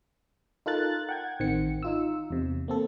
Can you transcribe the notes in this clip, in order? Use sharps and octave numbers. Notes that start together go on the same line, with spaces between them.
D#4 F4 A4 A#4 F#6 A6
F#5 G5 G#6
A1 D#3 C4 C#7
D#4 F4 E6
E2 C3
A#3 C4 A4